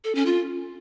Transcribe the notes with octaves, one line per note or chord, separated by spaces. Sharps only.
A4
C#4
F4